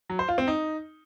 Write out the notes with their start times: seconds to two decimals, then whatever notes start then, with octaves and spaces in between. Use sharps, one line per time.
0.10 F#3
0.19 C5
0.28 F4
0.38 C4
0.47 D#4